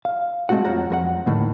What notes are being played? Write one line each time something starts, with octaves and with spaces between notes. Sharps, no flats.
F5
G#3 A3 C4 F#4 F#5
F2 F3 C#5 F#5 A#5
F2 A#4 F#5
D#2 A2 D3 D#3